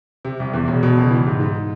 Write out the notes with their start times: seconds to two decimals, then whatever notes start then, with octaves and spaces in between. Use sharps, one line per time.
0.25 C3
0.40 C2
0.53 E2
0.68 E1
0.83 B2
0.97 C#2
1.11 E3
1.26 G#2
1.40 G#2